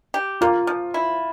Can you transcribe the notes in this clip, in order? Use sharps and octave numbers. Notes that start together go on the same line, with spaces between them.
G4
A#3 F4
F3
E4